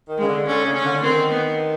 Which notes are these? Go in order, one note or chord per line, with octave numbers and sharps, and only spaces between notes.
D#3
C#3 G#3
D3
D3 C#4
C#3
C#4
D3
D3
D#3 C4
B3